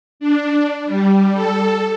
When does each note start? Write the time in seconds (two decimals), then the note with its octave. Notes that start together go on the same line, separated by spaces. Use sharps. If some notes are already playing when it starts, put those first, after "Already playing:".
0.20 D4
0.86 G3
1.34 A4